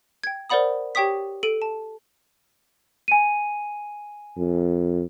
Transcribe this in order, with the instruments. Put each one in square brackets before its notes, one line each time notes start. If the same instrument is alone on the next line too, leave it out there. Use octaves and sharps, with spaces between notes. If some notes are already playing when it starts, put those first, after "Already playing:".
[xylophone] G5 G#6
A#4 C5 D5 F#5 B5 D#6
G4 C#5 G5 C#6 D#6 B6
A4 D7 D#7
A5
[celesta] G#5 D#7
[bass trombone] F2